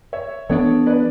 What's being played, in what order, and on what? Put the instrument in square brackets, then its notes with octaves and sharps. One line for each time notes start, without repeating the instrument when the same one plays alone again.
[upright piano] C#5 E5
[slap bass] E3 B3 D4 [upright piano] A4 C#5
[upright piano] B4 D5